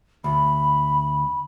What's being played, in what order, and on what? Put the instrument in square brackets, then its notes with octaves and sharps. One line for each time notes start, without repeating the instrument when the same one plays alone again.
[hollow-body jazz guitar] D2 [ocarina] B5